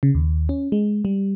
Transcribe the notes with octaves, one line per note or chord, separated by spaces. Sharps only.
C#3
D#2
C#4
G#3
G3